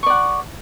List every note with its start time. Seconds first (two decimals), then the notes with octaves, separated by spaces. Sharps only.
0.03 C#6
0.06 D5
0.10 F#5